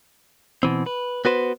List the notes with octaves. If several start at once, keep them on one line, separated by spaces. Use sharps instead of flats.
B2 E3 C4
B4
B3 F#4 B4 C5